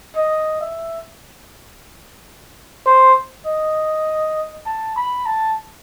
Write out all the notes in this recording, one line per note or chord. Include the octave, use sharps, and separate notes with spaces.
D#5
E5
C5
D#5
A5
B5
A5